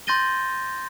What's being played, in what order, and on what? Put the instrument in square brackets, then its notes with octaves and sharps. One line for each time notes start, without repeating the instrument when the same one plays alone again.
[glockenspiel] C6 G6 A6 A#6 D#7 G7